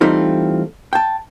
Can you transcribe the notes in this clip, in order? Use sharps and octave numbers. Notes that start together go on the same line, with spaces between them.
E3 G3 A3 C4 D#4 F4
G5 A5